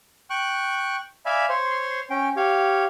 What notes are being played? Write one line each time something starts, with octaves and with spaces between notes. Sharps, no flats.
G5 C#6 F#6
D5 E5 F5 G#5 B5
C5 C#5 C6
C#4 G5
G4 C#5 F5